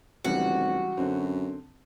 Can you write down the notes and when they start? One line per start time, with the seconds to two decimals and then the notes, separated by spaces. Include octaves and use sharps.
0.25 F1 C#2 E3 G3 F#4
0.97 F#2 D3 C4